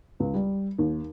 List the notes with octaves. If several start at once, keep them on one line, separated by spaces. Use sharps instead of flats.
C#2
G3
D#2